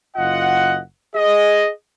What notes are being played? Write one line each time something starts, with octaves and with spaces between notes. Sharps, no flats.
F#1 F4 D#5 F#5
G#4 D#5